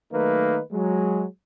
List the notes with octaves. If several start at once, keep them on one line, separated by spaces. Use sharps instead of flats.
D#3 F#3 A3 A#3 D#4 B4
F#3 G#3